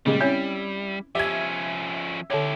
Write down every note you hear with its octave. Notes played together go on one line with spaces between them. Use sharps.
A#2 C#3 G3 G#3
C4 C#4 E4 C#5
F3 C#4 G4 E5 G#6
D3 E4 G4 C#5